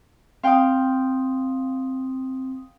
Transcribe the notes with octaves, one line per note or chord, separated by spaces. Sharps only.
C4 F5 G5 D#6